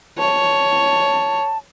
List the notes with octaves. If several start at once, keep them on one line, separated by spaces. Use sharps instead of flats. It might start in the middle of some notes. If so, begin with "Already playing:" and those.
C#5 A5